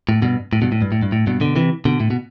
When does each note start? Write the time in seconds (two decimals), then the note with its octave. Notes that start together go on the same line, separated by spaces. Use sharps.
0.09 A2
0.22 G2 B2
0.53 A2
0.62 G2 B2
0.72 A2
0.82 G2
0.92 A2
1.02 G2
1.12 A2
1.27 G2 B2
1.41 B2 D3
1.56 C3 E3
1.85 B2 D3
2.00 A2
2.11 B2